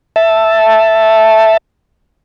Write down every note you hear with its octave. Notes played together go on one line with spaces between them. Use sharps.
E5 A5